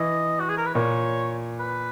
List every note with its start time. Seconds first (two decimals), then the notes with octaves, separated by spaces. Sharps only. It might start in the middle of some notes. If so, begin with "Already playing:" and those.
Already playing: E3 D#5
0.40 F#4
0.49 G#4
0.58 A#4
0.66 B4
0.75 A#2 C#5
1.60 B4